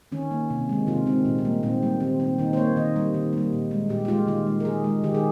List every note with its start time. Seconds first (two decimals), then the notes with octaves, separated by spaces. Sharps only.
0.12 D#3 C#4
0.31 A#3
0.50 C3
0.69 D#3 G#3
0.87 C3 F4
1.06 D#3 G#3 C4
1.25 A#2 C4
1.38 D#4
1.45 G3 A#3
1.63 A#2 C4
1.83 G3 A#3
2.00 D#3 C4
2.20 A#3 C4
2.38 D#3 D#4
2.53 C5
2.57 A#3 C#5
2.76 D#3 D#5
2.96 G3 A#3
3.14 D#3
3.33 G3 A#3
3.53 A#2
3.71 G#3
3.89 A#2 G4
4.05 G4
4.08 G#3 F4
4.27 D#3 F4
4.47 G#3
4.60 A#4
4.65 D#3 G#4
4.84 G#3
5.04 D#3 G4
5.15 G#4